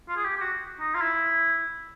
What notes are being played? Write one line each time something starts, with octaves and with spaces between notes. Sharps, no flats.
F4
G#4
G4
G4
F#4
D#4
F4
E4